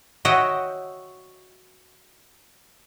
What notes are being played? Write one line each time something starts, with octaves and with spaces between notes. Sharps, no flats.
F#4 C#5 D#5 E5 F#5 G5